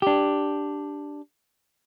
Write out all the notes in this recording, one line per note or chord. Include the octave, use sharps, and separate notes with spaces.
D4 G4